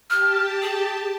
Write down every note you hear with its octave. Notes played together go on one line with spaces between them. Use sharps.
G4 A5 F6
G#4